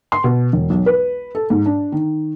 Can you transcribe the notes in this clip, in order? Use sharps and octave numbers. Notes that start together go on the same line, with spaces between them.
C6
B2
E1
B1
B4
A4
G#2
D4
D#3